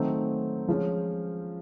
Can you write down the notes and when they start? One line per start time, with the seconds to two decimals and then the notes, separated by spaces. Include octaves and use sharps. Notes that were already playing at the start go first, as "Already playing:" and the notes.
Already playing: D#3 F#3 A3 C4 D#4
0.68 F3 G#3 C#4